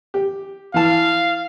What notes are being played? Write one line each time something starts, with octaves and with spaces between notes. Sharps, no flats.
G4
E3 F5 A5